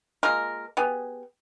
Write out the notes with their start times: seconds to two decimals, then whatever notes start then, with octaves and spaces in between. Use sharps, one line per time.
0.23 G#3 A#3 F4 A#4
0.77 B3 G4 G#4